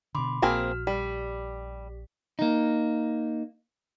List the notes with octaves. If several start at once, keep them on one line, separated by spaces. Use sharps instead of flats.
B2 D3 B5 C6 D6
A#1 A#3 C4 F#4 G#4 F6
G3 G4 B6
A#3 D#4